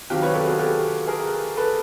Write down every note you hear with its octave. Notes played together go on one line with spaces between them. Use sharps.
C3 D#3 F#3 F4 G4
B4 C#5
G4 A4
F#4 G#4
G4 A4
G#4 A#4
A4 B4